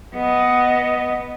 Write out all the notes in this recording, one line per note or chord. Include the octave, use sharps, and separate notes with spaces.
B3 D#5